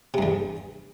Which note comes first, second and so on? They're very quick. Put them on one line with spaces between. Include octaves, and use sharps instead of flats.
C3 G2 E2